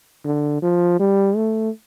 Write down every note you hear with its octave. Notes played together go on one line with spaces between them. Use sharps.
D3
F3
G3
A3